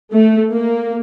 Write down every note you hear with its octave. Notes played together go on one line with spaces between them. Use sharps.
A3
A#3